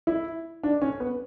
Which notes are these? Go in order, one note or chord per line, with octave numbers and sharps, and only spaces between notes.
E4
D4
C#4
B3